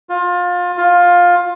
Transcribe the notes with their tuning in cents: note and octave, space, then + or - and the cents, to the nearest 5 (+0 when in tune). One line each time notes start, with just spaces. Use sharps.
F4 +25
F4 +15